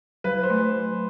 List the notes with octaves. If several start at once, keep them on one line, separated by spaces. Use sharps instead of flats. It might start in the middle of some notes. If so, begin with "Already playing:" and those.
F#3 B4
C5
A3